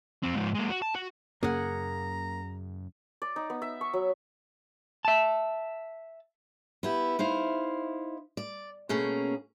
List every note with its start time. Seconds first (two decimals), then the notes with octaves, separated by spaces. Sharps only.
0.23 F2 C4
0.35 G#2 F3
0.54 G#3 A#3
0.70 F#4
0.82 A5
0.95 F#4
1.43 F#2 C#3 A#3 C#4 G#4 F#5 A#5
3.22 D5
3.36 D#4
3.50 B3
3.62 E5
3.81 C#6
3.93 F#3
5.05 E5 A5
6.83 B3 E4 G4
7.19 D#4 E4 C5 F5
8.37 D5
8.89 B2 A3 A#3 C#4 G#4